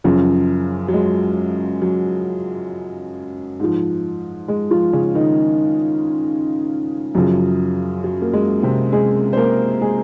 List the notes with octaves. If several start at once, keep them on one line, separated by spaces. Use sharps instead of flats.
F#2 C#3 F3 C#4
F#3
G#3
F#3
G#2 F3
G#3
F3 F4
C#3 C#4
D#3 D#4
F#2 C#3 F3 F#3
F#3
A#3
G#3
C3 C4
G#3 G#4
C5
A#3 A#4
G#3 G#4